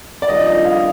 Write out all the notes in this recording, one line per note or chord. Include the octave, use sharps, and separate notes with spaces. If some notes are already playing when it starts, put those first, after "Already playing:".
D5
F2 D#3 G3 D4 F4 D#5
D#5
F5